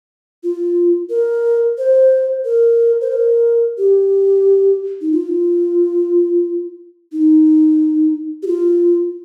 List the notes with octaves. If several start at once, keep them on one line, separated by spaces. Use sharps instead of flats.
F4
A#4
C5
A#4
C5
A#4
G4
D#4
F4
D#4
G4
F4